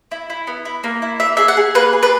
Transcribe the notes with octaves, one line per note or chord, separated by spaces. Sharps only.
E4
E4
B3
E4
A#3
E4
A#3 E5
G#4 E5
F#5
G#4
A#3 B4
G#4
B4